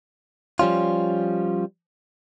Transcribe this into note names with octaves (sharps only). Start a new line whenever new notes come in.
F3 G3 C#4 F4